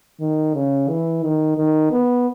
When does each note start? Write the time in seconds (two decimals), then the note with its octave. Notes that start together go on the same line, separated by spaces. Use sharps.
0.20 D#3
0.54 C#3
0.88 E3
1.23 D#3
1.58 D#3
1.91 B3